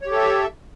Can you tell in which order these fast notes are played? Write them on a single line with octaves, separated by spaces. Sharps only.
C#5 G4 A4 E5